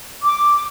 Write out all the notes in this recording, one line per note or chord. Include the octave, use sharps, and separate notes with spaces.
D6